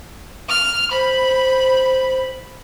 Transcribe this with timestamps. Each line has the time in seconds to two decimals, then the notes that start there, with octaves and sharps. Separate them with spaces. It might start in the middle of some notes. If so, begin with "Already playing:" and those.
0.49 F6
0.91 C5 B5